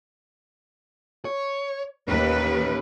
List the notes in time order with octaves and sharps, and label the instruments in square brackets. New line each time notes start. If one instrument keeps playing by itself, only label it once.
[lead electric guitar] C#5
[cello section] D#2 B4 [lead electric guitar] C#4 G4